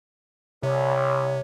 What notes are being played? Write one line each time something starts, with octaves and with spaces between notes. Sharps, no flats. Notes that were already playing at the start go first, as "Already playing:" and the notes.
C2 C3 C#5